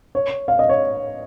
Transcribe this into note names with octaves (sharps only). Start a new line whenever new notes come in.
C#5
F5
D#5
C#5